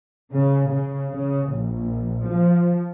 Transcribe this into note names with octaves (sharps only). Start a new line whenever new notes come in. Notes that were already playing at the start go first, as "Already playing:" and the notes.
C#3
C#3
C#3
A#1
F3